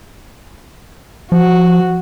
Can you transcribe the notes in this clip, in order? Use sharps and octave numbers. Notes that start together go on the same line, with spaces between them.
F3 F#4